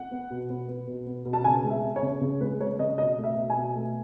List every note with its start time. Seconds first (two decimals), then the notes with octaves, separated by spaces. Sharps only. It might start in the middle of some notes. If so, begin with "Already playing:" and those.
Already playing: F#5
0.11 B3
0.30 B2
0.49 B3
0.68 B3
0.87 B2
1.06 B3
1.25 B2
1.33 A5
1.44 C#3 G#5
1.64 G#3
1.70 E5
1.84 B3
1.96 C#5
2.03 C#3
2.21 C#3
2.41 G#3 B4
2.60 G#3 C#5
2.79 C#3 D#5
2.98 B2 D#5
3.18 A3
3.24 E5
3.36 B2
3.50 G#5
3.56 B2
3.75 A3